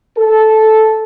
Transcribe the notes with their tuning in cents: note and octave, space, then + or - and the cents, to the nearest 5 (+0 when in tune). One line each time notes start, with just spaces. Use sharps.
A4 -10